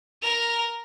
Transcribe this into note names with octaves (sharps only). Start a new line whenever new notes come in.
A#4 F7